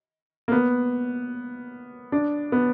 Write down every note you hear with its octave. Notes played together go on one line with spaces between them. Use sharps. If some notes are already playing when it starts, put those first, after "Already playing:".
A#3
B3
D4
B3